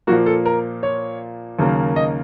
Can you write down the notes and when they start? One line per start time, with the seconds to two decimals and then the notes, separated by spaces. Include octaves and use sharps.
0.07 A#2 F3 A#3 F#4
0.26 A4
0.46 A#4
0.83 C#5
1.59 D#2 C#3 F#3 A#3
1.96 D#5